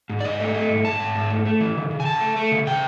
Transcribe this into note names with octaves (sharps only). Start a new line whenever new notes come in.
G#2
D5
G#2 D#5
A3
A3
G#2
G#2 A5
G#2
G#2
A3
A3
E3
C#3
C#3
G#5
C#3 A5
A3
A3
C#3
C#3 G5